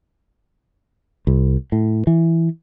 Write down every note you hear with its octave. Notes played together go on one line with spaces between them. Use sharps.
C2
A2
E3